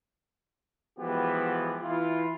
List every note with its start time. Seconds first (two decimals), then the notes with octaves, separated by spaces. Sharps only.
0.98 E3 F3 G#3 B3 F#4 G4
1.81 E3 E4 F4